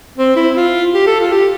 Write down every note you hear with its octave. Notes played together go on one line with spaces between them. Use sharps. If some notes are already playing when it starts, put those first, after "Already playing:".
C4
E4
F4
G4
A4
F4
G4